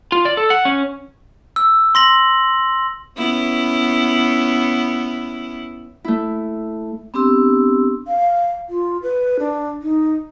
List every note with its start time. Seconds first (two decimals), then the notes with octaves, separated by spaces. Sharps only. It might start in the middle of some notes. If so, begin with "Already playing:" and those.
0.12 F4
0.25 D5
0.37 A4
0.50 F#5
0.65 C#4
1.56 E6
1.95 C6 A#6 F#7
3.17 B3 C#4 E4
6.04 A3 E4
7.14 B3 C4 D4 G4 C6 E6
8.08 F5
8.69 F4
9.03 B4
9.39 D4
9.82 D#4